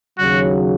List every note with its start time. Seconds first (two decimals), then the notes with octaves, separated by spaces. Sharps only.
0.18 D#2 C#3 F#3 F#4